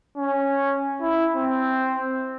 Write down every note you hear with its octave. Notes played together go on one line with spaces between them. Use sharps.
C#4
E4
C4